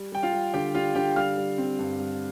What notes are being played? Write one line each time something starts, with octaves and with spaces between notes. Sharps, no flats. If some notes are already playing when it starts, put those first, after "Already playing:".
Already playing: G3
G3 G5
F4 F5
G3
D3 G4 G5
G3 F4 F5
D3 G4 G5
G3 F5 F6
G3
C4
G2
G3